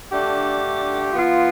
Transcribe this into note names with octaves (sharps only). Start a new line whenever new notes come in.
D3 A3 D4 G4
F3 B3 F4